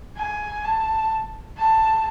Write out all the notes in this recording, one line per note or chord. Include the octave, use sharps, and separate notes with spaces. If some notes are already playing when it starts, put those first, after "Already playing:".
G#5
A5
A5